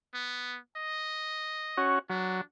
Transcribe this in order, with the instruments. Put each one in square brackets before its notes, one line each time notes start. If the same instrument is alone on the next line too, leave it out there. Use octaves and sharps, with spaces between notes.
[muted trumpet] B3
D#5
[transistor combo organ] C#4 F#4
[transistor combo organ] F#3 [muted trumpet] D4